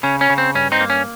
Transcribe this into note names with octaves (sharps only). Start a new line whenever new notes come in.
C#3 C#4
C#4
C#3
C4
G2 C#4
C4 D#4
A#3
C#4